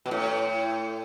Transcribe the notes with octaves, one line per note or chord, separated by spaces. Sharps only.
B2
A2